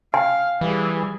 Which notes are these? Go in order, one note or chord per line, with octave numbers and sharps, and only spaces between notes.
F5 G5 G#5
E3 G3 G#4